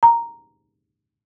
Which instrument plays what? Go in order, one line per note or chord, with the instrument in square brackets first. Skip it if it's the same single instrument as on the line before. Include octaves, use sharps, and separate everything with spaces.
[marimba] A#5